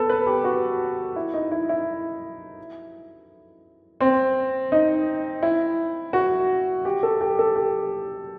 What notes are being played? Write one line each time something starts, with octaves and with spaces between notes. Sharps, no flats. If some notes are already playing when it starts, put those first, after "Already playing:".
Already playing: B3 A4
B4
G4
F#4
E4
D#4
E4
E4
C4
D#4
E4
F#4
G4
A4
G4
A4
G4